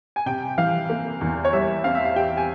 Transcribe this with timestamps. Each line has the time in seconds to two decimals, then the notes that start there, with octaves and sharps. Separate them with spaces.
0.16 G#5
0.26 C3 G5
0.58 E3 F5
0.90 A#3
1.21 E2
1.45 C#5
1.53 G3 E5
1.84 C4 F5
1.95 E5
2.05 F5
2.16 G4 G5
2.37 G#5